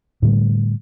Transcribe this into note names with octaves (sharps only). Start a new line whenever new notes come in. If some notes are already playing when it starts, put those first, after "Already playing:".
A2 D3 G3 A3